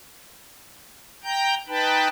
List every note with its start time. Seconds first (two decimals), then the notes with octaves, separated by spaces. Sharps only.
1.24 G5 A#5 G6
1.68 D#4 B4 G5 A5 B5